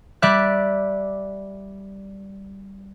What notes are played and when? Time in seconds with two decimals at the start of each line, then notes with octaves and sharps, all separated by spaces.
0.22 G3 D5 E5 F#6